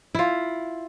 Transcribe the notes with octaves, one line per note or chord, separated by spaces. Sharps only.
E4 F4